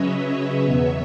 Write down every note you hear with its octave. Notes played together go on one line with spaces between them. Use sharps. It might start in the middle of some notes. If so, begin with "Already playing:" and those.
Already playing: C#3 F#3 C#4 B4 C#5 D#5 E5
E2 B2 F#3 B3